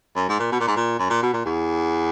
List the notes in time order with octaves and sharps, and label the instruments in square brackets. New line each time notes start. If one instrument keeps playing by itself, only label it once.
[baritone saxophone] F#2
G#2
A#2
B2
A#2
G#2
A#2
F#2
A#2
B2
A#2
E2